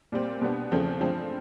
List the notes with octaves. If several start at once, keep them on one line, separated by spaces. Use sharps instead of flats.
A#2 G3 C4
B2 G3 B3 D4
E2 C#3 F3 A3 C4
G2 D3 F3 G#3 C4